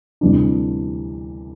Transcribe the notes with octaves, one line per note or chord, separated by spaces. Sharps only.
D2 C3 E3 G3 D4